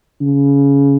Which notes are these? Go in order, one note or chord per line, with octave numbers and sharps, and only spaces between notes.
C#3